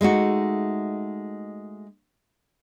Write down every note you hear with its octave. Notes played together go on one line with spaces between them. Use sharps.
G#3 A3 D#4 F#4